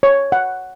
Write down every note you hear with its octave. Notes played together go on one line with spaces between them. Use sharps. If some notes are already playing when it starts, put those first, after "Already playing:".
C#5
F#5